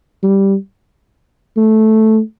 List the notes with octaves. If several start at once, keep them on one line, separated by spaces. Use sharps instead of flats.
G3
A3